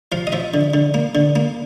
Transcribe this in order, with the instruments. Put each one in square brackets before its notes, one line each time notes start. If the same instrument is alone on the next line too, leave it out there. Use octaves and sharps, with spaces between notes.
[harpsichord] F3 F5
D#5
F3 E5
D3
D3
A#3
D3
A#3